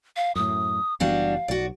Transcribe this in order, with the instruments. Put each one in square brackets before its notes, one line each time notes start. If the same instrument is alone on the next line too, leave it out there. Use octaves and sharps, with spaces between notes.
[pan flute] F5
[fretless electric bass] F#2 A2 [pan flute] D#6
[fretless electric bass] F#1 E3 B3 [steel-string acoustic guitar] G3 D4 F#4 [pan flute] F5
[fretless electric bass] B1 [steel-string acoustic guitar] F#4 D5